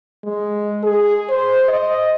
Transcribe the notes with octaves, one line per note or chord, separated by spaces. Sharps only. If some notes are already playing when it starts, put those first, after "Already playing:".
G#3
G#4
C5
D#5